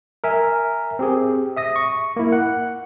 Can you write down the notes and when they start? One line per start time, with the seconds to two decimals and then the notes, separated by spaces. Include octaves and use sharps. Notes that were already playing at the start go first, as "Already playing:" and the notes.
0.24 A#4 E5 G#5
0.99 C4 G4 G#4
1.57 E5 D#6 A#6
1.76 C#6
2.16 A#3 E4
2.32 F#5